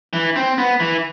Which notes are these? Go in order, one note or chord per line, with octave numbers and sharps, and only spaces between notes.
E3
C4
B3
E3